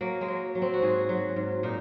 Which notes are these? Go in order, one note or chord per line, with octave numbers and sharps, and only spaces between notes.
F#3 A#3
G#3
F#3
F#3
C4
F#4
G#2 G#4
F#3
G#2
A#2 D#4